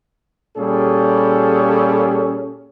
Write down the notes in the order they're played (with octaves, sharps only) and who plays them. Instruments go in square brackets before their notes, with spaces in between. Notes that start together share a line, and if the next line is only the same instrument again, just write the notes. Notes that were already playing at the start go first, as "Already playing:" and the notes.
[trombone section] A#2 G3 C#4 G#4 A4